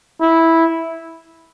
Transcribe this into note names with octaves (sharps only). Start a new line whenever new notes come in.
E4